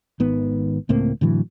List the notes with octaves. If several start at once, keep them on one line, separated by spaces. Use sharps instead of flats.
G#1 D#3 B3
C#2 A2 A#3 C4
A2 D3 E3 F#3